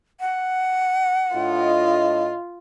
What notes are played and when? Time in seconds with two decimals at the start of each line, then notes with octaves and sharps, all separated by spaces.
0.20 F#5
1.34 A2 D4 F4 D#5